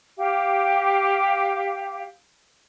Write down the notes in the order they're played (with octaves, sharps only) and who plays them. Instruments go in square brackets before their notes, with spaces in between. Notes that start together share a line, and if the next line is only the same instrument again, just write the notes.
[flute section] G4 F5